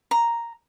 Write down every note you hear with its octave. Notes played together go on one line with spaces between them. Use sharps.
A#5